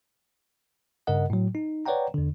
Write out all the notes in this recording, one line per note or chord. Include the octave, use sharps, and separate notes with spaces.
G2 C#3 A#4 D#5 F#5
A2 F#3
D#4
B4 C#5 D5 F#5 G5 A#5
E2 D3